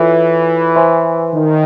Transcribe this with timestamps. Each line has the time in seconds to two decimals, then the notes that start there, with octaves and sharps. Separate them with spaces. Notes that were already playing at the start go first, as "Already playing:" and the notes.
Already playing: E3 F4 A4 C#5 E5
0.76 C5 E5 G#5 C6
1.33 D#3